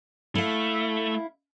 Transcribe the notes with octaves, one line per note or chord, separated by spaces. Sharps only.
A3 E4 F5